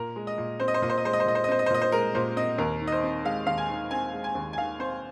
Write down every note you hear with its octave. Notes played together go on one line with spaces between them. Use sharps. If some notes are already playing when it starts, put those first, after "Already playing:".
Already playing: A#2 A#4
G#3
D#5
A#2
C4 C5
D#5
C5
A#2 D#5
C5
D#5
G#3 C5
D#5
C5
A#2 D#5
C5
D#5
C4 C5
D#5
C5
A#2 D#5
C5
G#3 A#4
A#2 C5
C4 D#5
D#2 A#4
D#3
D#5
C5
C4
G#3 F5
D#2 F5
G#5
D#3
C4 G#5
G#3
G#5
D#2
G#5
D#3 F5
C4 C5